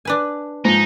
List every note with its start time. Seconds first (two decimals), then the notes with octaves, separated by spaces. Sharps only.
0.05 D4 B4 G#5
0.65 G#2 F3 D#4